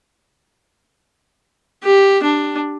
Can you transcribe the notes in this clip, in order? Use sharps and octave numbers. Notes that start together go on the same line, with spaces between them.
G4
D4